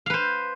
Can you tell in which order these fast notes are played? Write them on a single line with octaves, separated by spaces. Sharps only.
F5 B4 C5